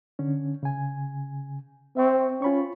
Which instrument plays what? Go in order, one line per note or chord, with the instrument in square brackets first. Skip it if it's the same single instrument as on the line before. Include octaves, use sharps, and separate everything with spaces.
[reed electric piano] D3 C#4
C#3 G#5
[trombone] C4 [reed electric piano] E5 C#6
[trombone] C#4 [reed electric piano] F4 B5 C#6